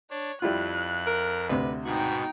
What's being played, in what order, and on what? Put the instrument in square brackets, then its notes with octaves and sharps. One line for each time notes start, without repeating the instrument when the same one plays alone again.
[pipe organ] D4 [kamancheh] C#5
[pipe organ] F2 [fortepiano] G3 E4 F4 [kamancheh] F#6
[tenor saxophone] A#4
[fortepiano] D2 C3 [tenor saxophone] B4
[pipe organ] G#2 B2 [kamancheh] D#4 G5 [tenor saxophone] F#4